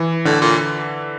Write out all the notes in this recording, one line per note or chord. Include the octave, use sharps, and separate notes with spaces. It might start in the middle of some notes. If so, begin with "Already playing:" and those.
Already playing: E3
A2 D3
A#2